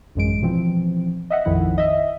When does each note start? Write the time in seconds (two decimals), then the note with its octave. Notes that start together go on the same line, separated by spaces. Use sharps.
0.15 A1 F#2 G#3 D7
0.42 B2 E3 F3 C4
1.30 D#5 E5 F#5
1.45 A#1 F2 D#3 F3 E4 F#5
1.78 D#5 E5